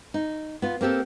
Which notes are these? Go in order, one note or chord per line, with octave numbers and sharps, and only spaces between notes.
D#4
B3 F4
A#3 C4 G4 A4